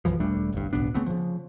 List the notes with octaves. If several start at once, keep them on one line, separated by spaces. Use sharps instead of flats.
B1 F#2 E3 F3
E1 G3 A3 D4
G1 C2 G2
D1 B1 B3 D4
C#3 A3 B3 C4
C#3 F3